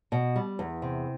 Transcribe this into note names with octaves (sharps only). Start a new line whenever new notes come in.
B2
G3
E2
C3